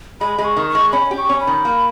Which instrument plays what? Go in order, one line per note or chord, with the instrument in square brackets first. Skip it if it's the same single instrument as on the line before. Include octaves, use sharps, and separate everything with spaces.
[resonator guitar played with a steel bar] G#3 [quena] B5
[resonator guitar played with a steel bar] G#3 [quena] B5
[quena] C#6
[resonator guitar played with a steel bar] D#3
[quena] C#6
[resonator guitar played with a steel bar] G#3
[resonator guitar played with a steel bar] C#4 [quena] B5
[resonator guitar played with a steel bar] G4
[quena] C#6
[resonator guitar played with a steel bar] C#4
[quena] B5
[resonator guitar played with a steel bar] D#3
A#3